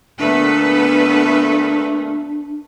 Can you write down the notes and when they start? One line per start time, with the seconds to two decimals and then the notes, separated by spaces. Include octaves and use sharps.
0.20 A#2 D3 A3 B3 D4 A4 B4